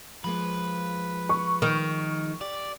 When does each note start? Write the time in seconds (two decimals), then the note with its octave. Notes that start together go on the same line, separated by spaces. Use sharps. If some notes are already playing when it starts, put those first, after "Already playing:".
0.24 F3 G#3 A#3 B4
1.29 C#6
1.62 D#3
2.41 G4 D5